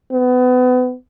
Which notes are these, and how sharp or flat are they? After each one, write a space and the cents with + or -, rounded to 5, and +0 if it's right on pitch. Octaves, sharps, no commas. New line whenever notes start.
B3 +30